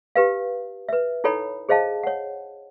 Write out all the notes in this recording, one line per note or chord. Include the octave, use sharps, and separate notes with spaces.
G4 B4 F5
B4 E5
D#4 E4 A4 C#5 G5 B5
G#4 C5 D#5 F5 A5
C#5 F#5